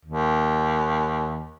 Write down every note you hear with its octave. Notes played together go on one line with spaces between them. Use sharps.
D#2